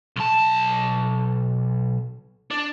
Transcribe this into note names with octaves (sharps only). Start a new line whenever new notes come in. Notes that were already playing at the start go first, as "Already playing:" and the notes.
B1 A5
D4